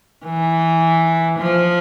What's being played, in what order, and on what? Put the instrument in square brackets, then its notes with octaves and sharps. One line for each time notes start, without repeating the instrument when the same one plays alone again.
[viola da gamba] E3
F3